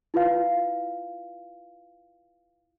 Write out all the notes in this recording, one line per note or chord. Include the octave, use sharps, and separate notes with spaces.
E4 F4 B4 F5